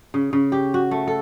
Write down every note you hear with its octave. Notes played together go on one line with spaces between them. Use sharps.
C#3
C#3
G4
F#4
A3
A4